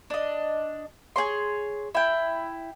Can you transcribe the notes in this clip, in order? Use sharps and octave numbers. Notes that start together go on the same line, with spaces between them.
D4 D#5
G#4 C#5 C6
E4 G5